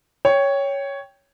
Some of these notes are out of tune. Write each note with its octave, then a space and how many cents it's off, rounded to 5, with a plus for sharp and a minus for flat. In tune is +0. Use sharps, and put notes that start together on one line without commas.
C#5 +5 G5 +5